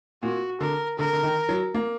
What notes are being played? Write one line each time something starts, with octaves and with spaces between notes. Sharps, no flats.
A#2 F#4
D3 A#4
D3 A#4
D3
D#3
F#3
A#3